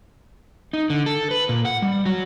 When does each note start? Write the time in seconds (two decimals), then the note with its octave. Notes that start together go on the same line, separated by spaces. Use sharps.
0.73 D#4
0.90 D3
1.06 A4
1.31 B4
1.49 A#2
1.65 F#5
1.82 G3
2.06 F#3